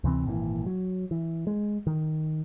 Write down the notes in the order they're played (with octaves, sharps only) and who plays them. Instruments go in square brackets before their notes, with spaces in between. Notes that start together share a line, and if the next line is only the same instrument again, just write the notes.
[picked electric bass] D2 C3 E3 C4
G#1 A#2 C#3 E3
F#3
E3
G#3
D#3